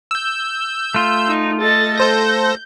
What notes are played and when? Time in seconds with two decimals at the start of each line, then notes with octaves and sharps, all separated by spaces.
0.11 E6 G6
0.94 A3 F4
1.27 D#4
1.61 A4 D#5 A6
1.98 A4 C5 G6 A#6